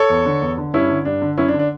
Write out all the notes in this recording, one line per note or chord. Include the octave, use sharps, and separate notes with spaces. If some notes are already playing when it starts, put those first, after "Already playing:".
Already playing: A4 C#5
E2
D3
E2
D3
G2 C#4 E4
D3
G2 D4
D3
F#2 C#4 E4
D4
D3
D4